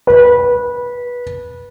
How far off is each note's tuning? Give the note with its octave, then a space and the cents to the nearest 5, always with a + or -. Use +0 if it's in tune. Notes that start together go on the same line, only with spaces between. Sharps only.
B4 -20